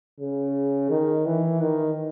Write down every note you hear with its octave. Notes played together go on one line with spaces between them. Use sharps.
C#3
D#3
E3
D#3